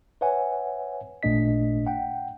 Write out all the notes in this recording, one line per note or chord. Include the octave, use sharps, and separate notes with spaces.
B4 C#5 E5 F#5 G#5
A1 A#2 A3 D4 D#5 B6
F#5 G5